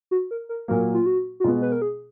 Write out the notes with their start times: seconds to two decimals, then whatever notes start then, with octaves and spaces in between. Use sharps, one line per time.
0.11 F#4
0.31 A#4
0.49 A#4
0.68 A#2 F#3 A#3 A#4
0.94 F4
1.06 F#4
1.40 F#4
1.44 B2 G#3 B3 F4
1.62 B4
1.72 A#4
1.82 G#4